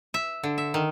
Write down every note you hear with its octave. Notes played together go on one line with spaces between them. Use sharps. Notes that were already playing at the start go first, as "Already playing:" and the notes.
E5
D3
E5
D#3